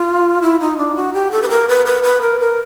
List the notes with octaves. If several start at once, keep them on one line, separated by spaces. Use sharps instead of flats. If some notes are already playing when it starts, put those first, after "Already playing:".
Already playing: F4
E4
D#4
D4
F#4
G4
A4
B4
A#4
B4
B4
B4
A#4
A#4